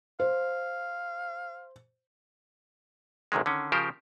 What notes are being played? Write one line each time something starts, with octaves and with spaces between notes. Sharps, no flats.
C5 F5
A1 F#2 C3 D#3 G#3
D3 D#3 C#4
C#3 F3 G4 A#4 C5